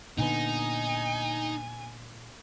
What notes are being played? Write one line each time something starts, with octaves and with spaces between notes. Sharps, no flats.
A#2 D3 B3 D#4 G#5